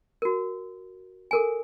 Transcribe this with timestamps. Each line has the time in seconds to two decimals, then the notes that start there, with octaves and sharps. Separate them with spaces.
0.22 F#4 A#4
1.31 A4 A#4 G#5